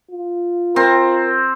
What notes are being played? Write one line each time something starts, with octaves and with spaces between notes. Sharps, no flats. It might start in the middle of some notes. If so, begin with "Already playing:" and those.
F4
C4 A#4